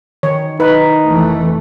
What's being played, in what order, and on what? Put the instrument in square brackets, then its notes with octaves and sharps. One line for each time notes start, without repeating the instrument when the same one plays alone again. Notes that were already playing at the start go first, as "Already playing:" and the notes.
[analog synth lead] D#3 [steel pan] C#5
[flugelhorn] D#4 [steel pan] B4
[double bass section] F1 E3 A3